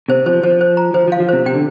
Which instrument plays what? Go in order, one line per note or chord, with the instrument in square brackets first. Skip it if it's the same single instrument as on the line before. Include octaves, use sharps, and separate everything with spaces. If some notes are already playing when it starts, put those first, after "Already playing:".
[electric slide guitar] C3 [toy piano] C5
[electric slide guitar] F3 [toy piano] C5
[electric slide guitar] F3 [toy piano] C5
[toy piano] C5
A#5
[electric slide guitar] F3 [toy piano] C5
[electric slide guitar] F3
[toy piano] F5
[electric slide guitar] F3
[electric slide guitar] C3 [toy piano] C5
[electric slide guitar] C3 [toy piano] G5
[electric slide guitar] D3